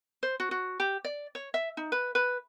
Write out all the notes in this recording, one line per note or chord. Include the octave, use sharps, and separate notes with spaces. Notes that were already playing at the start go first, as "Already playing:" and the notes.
C5
F#4
F#4
G4
D5
C#5
E5
D#4
B4
B4